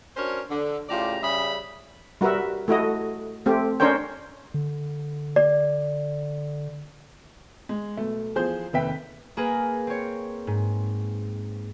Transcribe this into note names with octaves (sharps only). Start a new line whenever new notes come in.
C#4 D4 F#4 A#4 C5 C#5
D3
A2 C#3 F4 G4 D5 A#5
C#3 G3 C#4 G#4 E5 B5
G3 F#4 A#4 B4 E5
A3 E4 F#4 D#5
A3 C4 G4
C#4 D4 A#4 C5 C#5 G5
D3
D5
G#3
B1 B2 A3
E2 F3 G#4 C5 G6
F1 D#2 B4 E5 G5 B6
A#3 G#4 A#4 B4
C4 C#5
G#2